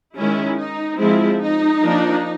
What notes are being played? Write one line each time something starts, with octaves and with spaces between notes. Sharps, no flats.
D#3 G#3 C#4 E4
D#4
F3 G#3 C4 E4
D#4
F3 A#3 D4